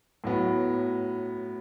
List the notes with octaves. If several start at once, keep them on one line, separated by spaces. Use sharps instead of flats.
A2 F#3 B3